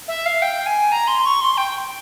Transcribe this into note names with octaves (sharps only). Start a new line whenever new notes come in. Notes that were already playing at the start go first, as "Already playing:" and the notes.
E5
F5
G5
G#5
A#5
C6
C#6
C6
G5